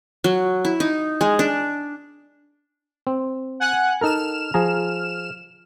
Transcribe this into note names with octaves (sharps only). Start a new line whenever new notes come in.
F#3
E4
D#4
G#3
D4
C4
F#5 G#5 F#6
D#4 A4 A#4 F6 E7
F3 G#4 A#5